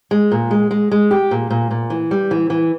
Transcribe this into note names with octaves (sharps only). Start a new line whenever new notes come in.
G#3
A#2
G#3
G#3
G#3
G4
A#2
A#2
A#2
E3
G3
E3
E3